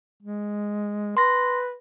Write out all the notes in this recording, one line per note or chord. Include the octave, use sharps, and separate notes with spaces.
G#3
B4 C6 A#6